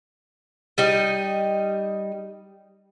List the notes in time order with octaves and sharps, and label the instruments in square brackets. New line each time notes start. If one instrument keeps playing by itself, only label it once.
[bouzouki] G3 D#4 D#5